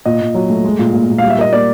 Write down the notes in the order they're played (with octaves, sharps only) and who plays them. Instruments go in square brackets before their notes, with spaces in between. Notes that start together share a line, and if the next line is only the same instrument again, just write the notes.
[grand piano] A#2 [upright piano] D#5
[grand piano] A#2
F#3
A3
G#3
A#2
A#2
A#2
[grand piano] G3 [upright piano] F5
[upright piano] E5
[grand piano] A#3 [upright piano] D#5
[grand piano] A#3 [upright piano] D5